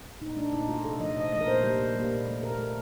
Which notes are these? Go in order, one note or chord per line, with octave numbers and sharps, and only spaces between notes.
A#2 D#4
D#4
A3 D4
A#2 D#4
A3 F4
C3 A4
F3 A3 D#5
C3 D#5
F3 A3 D#5
A#4
A#2 C5
G3 A#3 C5
A#2
G3 A#3
A#2
A3
A#2 A#4
A3